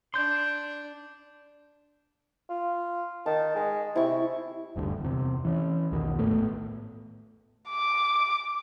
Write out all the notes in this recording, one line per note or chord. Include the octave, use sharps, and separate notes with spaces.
D4 C6 G6
F4
D#3 A5
G#3
C3 E4 C#6
F#1 D2 G2 D3
E2 C3
E3 C#4
B1 E2 B2 D#3
G#1 A2 A3 B3
D6